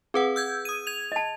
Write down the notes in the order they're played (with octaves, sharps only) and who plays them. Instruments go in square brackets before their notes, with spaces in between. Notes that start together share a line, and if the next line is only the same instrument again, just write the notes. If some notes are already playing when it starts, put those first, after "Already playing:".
[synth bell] C4 B4 F#5 [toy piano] G#4
[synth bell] E6 G6 G#6
D#6 D#7
G#6 F7
[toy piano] D#5 A5